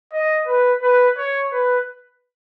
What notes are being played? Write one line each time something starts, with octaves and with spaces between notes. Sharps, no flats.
D#5
B4
B4
C#5
B4